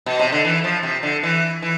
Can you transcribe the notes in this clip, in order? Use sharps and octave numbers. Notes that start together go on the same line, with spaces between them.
B2
C3
D3
E3
F3
C3
D3
E3
E3